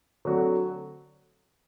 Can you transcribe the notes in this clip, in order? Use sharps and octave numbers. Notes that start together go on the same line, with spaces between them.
D3 F#3 A3 C4 F#4